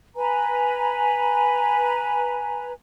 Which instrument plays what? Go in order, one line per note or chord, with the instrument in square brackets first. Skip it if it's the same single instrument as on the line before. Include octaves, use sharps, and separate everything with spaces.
[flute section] B4 G#5 A#5